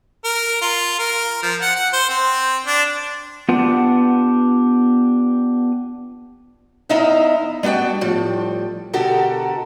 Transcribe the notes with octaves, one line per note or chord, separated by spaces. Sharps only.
A#4
F4
A#4
F3
F#5
F#5
C5
C4
D4
B3 D4 F4 G4 B4 F#5
E2 B3 D#4 E4 D#5 F5
G3 B3 D4 F#4 G5
A2 F3 G3
B2 D3 F#4 G4 A4 A#4